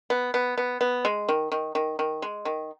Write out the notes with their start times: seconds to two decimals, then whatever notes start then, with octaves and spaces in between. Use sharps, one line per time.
0.10 B3
0.34 B3
0.58 B3
0.81 B3
1.05 G#3
1.29 D#3
1.52 D#3
1.75 D#3
1.99 D#3
2.22 G#3
2.45 D#3